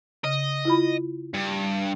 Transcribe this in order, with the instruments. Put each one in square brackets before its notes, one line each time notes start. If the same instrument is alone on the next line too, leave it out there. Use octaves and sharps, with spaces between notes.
[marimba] C#3 [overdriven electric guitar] D#5
[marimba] E4 F4 B5
[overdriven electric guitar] G2